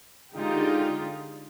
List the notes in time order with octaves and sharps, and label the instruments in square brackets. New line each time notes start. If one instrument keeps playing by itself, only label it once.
[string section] D3 G#3 D#4 F4 G4